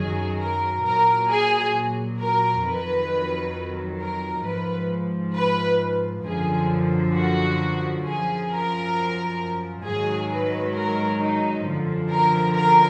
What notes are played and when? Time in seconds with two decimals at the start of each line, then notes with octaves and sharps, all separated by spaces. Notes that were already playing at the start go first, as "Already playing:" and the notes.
Already playing: F#2 D#3 F#3 G#4
0.39 A#4
0.84 A#2 F#3 A#4
1.30 G#4
2.19 A#4
2.64 F2 D#3 F#3 B4
3.99 A#4
4.44 G#2 F3 B4
5.35 B4
6.24 F#2 D3 F3 G#4
7.15 F#4
8.05 F#2 F3 G#4
8.50 A#4
9.85 G#2 D#3 F#3 G#4
10.30 B4
10.75 A#4
11.19 D#4
11.65 F#2 D3 F3
12.10 A#4
12.55 A#4